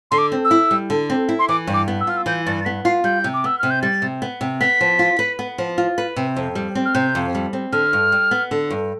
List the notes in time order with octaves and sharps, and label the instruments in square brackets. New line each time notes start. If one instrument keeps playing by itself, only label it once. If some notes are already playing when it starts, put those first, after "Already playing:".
[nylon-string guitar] D3 [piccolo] C6
[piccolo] D6
[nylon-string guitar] C4
[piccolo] E6
[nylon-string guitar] E4
G3
D3
C4
E4
[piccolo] C6
[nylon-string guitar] E3 [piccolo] D6
[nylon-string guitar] G2
[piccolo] D6
[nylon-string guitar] B3
[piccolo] E6
[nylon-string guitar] F4 [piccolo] F6
[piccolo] E6
[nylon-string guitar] E3 [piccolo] G6
[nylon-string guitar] G2 [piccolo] A6
[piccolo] A6
[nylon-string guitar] B3 [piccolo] B6
[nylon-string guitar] F4 [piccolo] C7
[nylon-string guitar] G3 [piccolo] G6
[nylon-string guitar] C3
[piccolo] D6
[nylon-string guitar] B3 [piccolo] E6
[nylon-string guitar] C3 [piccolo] F6
[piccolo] G6
[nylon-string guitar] G3 [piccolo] A6
[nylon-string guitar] C3
B3
C3
[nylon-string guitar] B3 [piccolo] B6
[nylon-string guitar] F3
F4
B4
B3
F3
F4
B4
C3
F2
G3
C4
[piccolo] F6
[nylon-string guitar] C3 [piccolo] G6
[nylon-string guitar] F2
G3
C4
[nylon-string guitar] D3 [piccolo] F6
[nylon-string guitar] G2
G3
B3
D3
G2